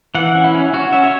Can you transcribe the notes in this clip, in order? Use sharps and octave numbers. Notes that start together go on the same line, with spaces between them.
E3 F#5
C#4
E4
C#4
C#4 F#4
C#4 E5
C#5